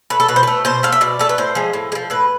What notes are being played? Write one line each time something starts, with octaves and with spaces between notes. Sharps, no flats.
A3 B4
A4
B2 B4
C5
A3 B4
B2 C5
A3 F5
E5
B2 D5
A3 A4
B4
A2 C5
F3 G#3
A2
G#3
F3
A2 B4